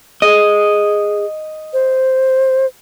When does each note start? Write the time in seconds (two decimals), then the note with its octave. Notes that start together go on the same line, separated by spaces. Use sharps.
0.22 G#4 D#5
1.73 C5